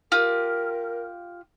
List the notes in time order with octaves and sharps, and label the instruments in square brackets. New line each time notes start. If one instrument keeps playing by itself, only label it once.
[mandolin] F4 G4 [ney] A#4